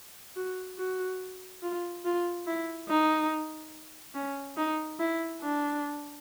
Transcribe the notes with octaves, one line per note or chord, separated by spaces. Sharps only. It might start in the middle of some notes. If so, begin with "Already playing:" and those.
F#4
F#4
F4
F4
E4
D#4
C#4
D#4
E4
D4